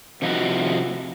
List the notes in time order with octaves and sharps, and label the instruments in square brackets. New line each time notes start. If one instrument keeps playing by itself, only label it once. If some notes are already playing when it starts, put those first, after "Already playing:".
[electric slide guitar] C3 F3 D#4 E4 F#4